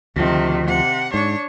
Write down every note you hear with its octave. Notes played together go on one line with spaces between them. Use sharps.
D2 C3 D#3 F3
C3 F#5
G#2 D4 C#5